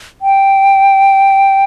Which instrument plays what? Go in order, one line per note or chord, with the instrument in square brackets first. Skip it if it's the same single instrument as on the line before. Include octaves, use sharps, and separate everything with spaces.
[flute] G5